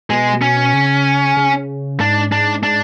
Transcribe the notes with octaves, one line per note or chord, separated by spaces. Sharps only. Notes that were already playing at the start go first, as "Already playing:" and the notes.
B2 G#3
C#4
C#3
C#3
G#2 D4
D4
D4